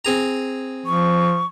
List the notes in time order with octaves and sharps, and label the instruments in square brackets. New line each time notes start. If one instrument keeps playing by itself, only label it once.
[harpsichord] C4 G#4 A#5
[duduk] F3 [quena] C#6